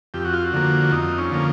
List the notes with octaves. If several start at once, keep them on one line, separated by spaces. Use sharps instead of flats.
F2 G4
F#4
F4
F#4
D3 F3 A#3
F2 D#4
C#4
D3 F3 A#3